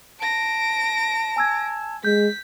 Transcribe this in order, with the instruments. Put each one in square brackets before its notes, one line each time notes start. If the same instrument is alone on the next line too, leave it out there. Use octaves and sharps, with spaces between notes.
[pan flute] A5 [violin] A#6 D7
[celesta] G#5 E6 G#6
[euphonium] G#3 [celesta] G6 [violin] B6